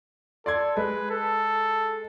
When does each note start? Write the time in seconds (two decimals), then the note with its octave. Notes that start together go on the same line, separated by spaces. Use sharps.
0.46 A4 D5 C6 G#6
0.77 G#3 B4
1.11 A4